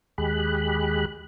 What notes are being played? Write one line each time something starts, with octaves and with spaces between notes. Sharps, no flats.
D#2 G#3 G4 G#4 B5 F#6